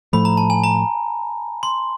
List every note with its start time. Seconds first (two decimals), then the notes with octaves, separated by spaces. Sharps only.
0.13 A2 F3 A3 B5
0.25 A#5
0.37 A5
0.50 G#5
0.63 A#5
1.63 C6